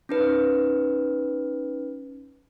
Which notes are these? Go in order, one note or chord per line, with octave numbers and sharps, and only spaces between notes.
C#4 D#4 B4